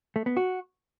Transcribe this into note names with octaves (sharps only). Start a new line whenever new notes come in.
A3
B3
F#4